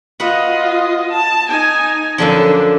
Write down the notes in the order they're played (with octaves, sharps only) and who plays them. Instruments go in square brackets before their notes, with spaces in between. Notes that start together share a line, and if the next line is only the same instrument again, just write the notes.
[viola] F4 D#5 [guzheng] F#4 B4 F#5
[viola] A5
D#4 G#5
[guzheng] F#2 D3 F3 [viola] D4 A4